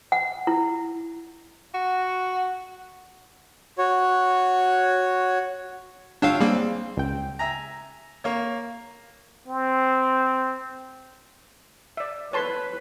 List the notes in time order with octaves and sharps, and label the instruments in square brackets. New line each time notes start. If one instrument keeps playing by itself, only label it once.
[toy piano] F#5
E4
[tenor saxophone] F#4
[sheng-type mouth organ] F#4 C#5
[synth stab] G1 A2 E6 [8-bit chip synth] D4 F5 [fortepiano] F4 G4 C#5
[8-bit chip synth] G3 A#3 [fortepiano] C4 [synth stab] G#4
[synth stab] C#2 G5
[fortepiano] E5 G#5 A#5
A#3 C#5
[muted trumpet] C4
[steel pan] D5 E5
[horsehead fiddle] B4 [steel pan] C#5 A5 C6